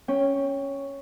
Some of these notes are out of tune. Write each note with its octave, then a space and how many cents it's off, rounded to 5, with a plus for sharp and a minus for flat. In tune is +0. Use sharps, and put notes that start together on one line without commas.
C#4 +0 G5 +15